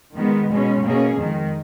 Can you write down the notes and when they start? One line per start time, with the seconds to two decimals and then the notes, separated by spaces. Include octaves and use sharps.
0.17 D#3 G#3 B3
0.51 B2 G#3 C#4
0.86 B2 A#3 C#4 G#4
1.19 F2 D#3 G#3